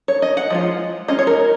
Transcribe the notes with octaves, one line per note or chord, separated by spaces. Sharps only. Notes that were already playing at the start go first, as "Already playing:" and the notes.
C#5
D#5
F#5
F3 G#3 F4
G#3 C#4 F4 D#5
C#5
A#4